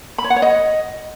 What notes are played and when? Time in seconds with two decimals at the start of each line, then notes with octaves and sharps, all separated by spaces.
0.18 B5
0.24 C#5
0.30 F#5
0.36 C#5
0.42 D#5